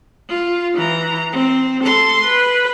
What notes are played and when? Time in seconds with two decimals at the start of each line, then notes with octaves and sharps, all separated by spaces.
0.29 F4
0.75 E3 A#5
1.32 C4
1.84 A4 C6
2.24 B4